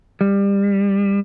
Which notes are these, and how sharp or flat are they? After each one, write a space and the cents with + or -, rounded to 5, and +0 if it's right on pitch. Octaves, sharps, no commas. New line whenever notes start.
G3 +25